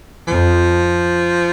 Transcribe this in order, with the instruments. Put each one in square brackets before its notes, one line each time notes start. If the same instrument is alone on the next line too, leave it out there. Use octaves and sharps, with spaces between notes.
[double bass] F2 [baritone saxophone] F3